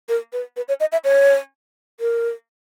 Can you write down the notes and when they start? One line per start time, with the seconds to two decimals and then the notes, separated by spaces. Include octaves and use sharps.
0.09 A#4
0.33 B4
0.57 B4
0.68 C#5
0.80 D#5
0.92 E5
1.04 C#5
2.00 A#4